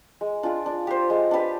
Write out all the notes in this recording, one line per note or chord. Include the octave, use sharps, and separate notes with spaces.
G#3
D4 F4 G#4
D4
G4 C5
G#3
D4 G4 B4